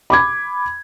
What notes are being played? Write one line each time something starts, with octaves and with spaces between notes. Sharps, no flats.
B5 D6 G#6